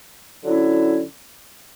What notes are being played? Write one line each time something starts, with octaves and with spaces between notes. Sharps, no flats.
D3 F#3 C#4 E4